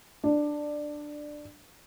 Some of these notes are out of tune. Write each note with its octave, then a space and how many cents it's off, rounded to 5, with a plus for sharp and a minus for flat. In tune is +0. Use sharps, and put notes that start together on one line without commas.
D4 +10